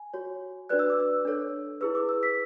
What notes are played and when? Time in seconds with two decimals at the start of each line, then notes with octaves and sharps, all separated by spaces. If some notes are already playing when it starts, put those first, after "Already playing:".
Already playing: G#5
0.14 F#4 C#5
0.69 D4 F#4 B4 D5 F#6
0.79 E6
0.90 D6
1.00 E6
1.25 D4 A4 C#5
1.81 E4 G#4 B4 E6
1.95 D6
2.09 E6
2.23 B6